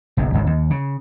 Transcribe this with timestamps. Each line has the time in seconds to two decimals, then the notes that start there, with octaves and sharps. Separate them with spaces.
0.17 F#1 B1 F#2
0.34 G#1 C#2
0.47 D#2
0.70 C#3